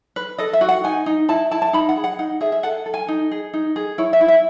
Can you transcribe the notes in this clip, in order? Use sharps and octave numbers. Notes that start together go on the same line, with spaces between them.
B4
A4 D#5
E5
F#4
F#5
D#4 G#5
D#4
E4 A5
E4 A5
A5
D#4 B5
F#5
G#4
F#5
D#4 F#5
G#4 E5
E5
A4 F#5
A4
G#5
D#4
G#4
D#4
G#4
E4 C#5
E5
E4
E5